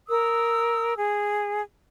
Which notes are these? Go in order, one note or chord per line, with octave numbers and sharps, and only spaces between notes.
A#4 D#6 E6
G#4